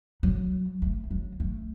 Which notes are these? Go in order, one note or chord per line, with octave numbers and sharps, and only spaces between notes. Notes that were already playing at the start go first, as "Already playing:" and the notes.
F#3
A3
F#3
A3